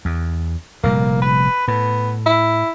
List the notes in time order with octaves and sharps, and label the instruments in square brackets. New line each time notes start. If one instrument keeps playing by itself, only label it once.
[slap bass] E2
[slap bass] F1 A#2 G3 [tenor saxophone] A#3
[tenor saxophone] B4
[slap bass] A2 [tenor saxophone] B3
[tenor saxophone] E4